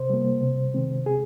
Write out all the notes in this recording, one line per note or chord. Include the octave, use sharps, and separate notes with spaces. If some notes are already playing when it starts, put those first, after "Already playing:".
Already playing: C3 C5
G3 A#3
C3
D#3 G#3 C4
C3 G#4